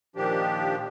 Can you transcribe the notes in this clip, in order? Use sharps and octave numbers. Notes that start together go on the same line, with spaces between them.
A#2 D#3 F3 D4 G4